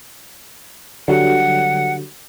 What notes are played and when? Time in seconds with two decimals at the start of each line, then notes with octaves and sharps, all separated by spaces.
1.08 D3 F#3 G3 F#5